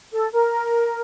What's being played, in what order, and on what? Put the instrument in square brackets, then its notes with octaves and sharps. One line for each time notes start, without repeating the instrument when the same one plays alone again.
[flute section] A4
A#4